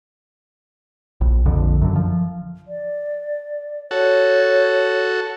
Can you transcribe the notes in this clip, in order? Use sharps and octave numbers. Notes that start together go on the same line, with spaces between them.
A#1
A#1 F2 D3
F#2 D3
F3
D5
F#4 A4 C#5